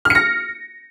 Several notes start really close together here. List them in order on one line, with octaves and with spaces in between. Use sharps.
F6 C#7 A#6